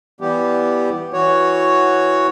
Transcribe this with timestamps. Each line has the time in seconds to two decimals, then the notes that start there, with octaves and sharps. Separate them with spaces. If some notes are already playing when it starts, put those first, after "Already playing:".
0.21 E3 G3 B3 G4
1.13 E3 F#4 C#5